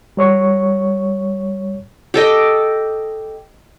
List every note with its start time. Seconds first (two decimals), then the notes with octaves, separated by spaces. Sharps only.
0.17 G3 C#5 C#6
2.14 G4 A4 D#5 G5